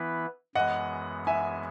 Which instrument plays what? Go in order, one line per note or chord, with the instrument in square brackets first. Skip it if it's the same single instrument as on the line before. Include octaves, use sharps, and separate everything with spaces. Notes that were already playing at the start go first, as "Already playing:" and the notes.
Already playing: [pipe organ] E3 B3 E4 B4
[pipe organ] F#2 E3 G#3 B3 [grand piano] D#5 F#5
[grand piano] E5 G#5